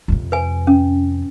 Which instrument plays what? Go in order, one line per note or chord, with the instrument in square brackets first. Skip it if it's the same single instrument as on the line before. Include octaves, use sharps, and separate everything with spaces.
[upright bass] F2 C3
[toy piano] B4 G#5
C#4